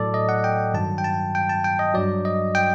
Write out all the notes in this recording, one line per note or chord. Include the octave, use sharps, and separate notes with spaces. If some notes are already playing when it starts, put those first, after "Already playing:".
Already playing: A2 F#3 A4 D5
D#5
F#5
G5
G2 D#3 F#3 A5
G5
A5
G5
A5
G5
D#5
G2 F#3 D5
D#5
G5